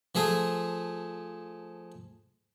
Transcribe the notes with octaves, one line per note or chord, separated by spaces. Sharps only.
F3 A3 G#4